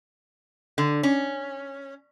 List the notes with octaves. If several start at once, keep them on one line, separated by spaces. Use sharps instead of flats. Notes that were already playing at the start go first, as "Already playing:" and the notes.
D3
C#4